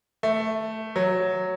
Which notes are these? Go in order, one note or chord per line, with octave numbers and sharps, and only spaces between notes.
A3
F#3